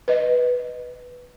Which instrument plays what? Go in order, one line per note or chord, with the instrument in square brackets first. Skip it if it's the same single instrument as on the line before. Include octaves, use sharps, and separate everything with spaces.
[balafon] B4 D#5